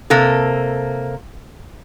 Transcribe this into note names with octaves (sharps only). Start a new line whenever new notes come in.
C3 A#3 A4